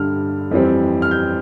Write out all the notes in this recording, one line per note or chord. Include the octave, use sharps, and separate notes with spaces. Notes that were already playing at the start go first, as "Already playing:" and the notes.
Already playing: G2 D3 G3 F6
F2 E3 G3 C4
F6
G6